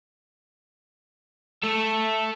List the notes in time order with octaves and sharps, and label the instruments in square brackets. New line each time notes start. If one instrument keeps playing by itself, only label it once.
[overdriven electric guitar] A4 E5